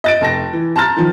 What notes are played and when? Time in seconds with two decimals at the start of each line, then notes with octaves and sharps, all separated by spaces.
0.04 D#5 A6 D7
0.21 F1 A5 A#6
0.53 E3
0.76 A5 A#5 C6 F6 A6
0.97 D#3 F3